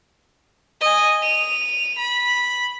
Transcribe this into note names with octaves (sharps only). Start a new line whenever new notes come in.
D#5 G#5
D#7 F7
B5